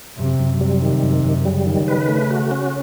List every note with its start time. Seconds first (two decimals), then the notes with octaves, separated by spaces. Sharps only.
0.19 F#2 C3
0.39 F#2
0.61 C3 G3
0.82 D#3
1.03 F#2
1.24 F#2
1.45 C#3 G3
1.66 D#3
1.88 B4
2.08 A3
2.31 F#4
2.51 C#4